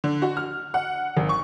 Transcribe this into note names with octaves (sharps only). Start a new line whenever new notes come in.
D3
F#4
F6
F#5
G#1
C#6